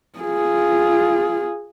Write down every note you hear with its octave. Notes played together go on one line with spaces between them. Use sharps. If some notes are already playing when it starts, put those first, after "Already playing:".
F4 G#4